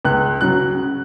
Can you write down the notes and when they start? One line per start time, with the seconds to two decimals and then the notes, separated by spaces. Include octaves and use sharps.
0.05 C#2 F#6
0.41 C#3 F#3 F#6